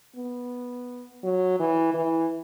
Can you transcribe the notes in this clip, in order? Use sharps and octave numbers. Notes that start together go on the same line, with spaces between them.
B3
F#3
E3
E3